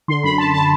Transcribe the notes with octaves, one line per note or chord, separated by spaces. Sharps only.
D3 C6
F#2 B5
F#2 A5
D3 A5